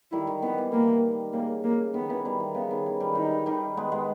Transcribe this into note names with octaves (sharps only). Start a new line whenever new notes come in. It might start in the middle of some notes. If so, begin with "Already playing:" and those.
D#3 G3 E4
D#3
D#3 B3
E3
D#3 A#3
C#3 A#3
A#3
D#3 B3
E3
D#3 G3
D#3
C#3 B3
D#3
E3
D#3 G3
D#3 G3 D#4
D#3 G3
G#3 B3
G#3 B3